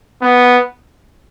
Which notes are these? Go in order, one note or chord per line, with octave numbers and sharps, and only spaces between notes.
B3